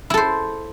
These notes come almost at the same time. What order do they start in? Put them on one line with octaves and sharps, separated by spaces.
E4 A4 C5